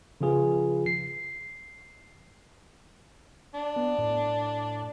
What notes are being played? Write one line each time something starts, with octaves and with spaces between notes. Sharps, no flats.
C#3 F3 F4 G#4 B4
C7
D4
B3
A2